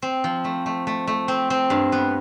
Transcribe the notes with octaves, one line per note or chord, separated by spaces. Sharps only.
C4
F3
A3
A3
A3
A3
C4
C4
G2
B3